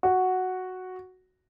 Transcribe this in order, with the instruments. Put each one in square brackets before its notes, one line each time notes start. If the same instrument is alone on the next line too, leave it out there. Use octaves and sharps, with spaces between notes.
[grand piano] F#4